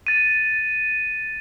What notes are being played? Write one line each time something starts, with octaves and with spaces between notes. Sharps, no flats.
A6 D#7